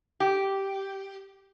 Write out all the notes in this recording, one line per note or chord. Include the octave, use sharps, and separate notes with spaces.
G4